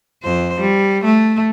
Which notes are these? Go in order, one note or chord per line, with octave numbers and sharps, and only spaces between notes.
F2 C5
G3
A3